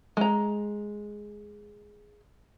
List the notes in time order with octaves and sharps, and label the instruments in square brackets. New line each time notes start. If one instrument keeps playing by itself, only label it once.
[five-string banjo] G#3 A#5